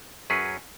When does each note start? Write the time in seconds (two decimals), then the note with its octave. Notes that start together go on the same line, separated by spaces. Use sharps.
0.30 F#2 F#3 C#4 G#4 B4